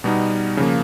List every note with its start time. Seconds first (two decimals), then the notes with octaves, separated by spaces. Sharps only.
0.04 B2 G3 B3 D#4
0.57 C#3 F3 A#3